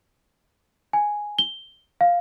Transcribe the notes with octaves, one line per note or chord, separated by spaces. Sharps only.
G#5
G7
F5